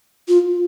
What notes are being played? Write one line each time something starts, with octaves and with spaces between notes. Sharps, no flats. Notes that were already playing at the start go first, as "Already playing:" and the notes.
F4